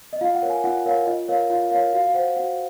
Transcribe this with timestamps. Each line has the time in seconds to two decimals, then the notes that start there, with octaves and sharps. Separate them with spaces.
0.13 D#5
0.21 F4 F5
0.35 F#5
0.42 A#4 C#5
0.50 G#5
0.64 F4 F#5
0.85 A#4 C#5 F5
1.07 F4 D#5
1.28 A#4 C#5 F5
1.50 F4 F5
1.71 A#4 C#5 F5
1.93 F#4 F5
2.06 F5
2.15 C5 F#5
2.36 F#4 F#5